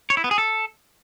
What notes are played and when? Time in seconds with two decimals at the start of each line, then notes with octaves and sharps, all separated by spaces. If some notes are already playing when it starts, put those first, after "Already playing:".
0.10 C#5
0.17 E4
0.24 B3
0.31 G#4
0.38 A4